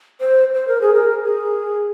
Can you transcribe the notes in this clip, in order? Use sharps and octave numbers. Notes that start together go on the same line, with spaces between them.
C5
C5
A#4
G#4
A#4
G#4